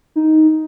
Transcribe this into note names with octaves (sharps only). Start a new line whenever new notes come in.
D#4